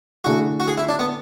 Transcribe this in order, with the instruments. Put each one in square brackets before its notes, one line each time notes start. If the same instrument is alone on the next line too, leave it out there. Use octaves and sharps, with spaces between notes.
[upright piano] D3 A3 E4 G#4 [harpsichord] F#4
[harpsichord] F#4
G#4
E4
D4
B3